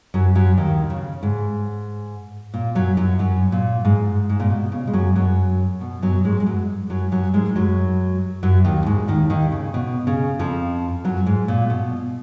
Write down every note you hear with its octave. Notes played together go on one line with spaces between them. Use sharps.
F#2 F#3
F#2 F#3
D#2 D#3
C#3
G#2
A#2
F#2 F#3
F#2 F#3
F#2 F#3
A#2
G#2
G#2
A#2
B2
C#3
G#3
F#2 F#3
F#2 F#3
B2
F#2 F#3
G#2 G#3
G#3
F#2 F#3
F#2 F#3
F#2 F#3
G#2 G#3
F#2 F#3
F#2 F#3
D#2 D#3
G#2
D#2 D#3
D#2 D#3
C#3
B2
C#3
F2 F3
F#2 F#3
G#2
A#2
B2